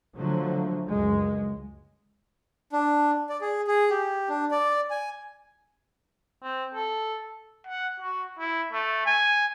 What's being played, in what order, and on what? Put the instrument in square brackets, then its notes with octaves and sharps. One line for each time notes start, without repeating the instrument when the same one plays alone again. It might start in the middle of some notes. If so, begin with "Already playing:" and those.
[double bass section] D3 F3 F#3 A3
C#2 F#2 G#3
[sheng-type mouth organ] D4
D5
G#4
G#4
G4
D4
D5
G#5
[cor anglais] C4
A4
[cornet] F#5
F#4
E4
A3
G#5